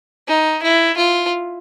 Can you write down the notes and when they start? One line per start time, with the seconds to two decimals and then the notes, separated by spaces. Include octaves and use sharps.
0.28 D#4
0.63 E4
0.97 F4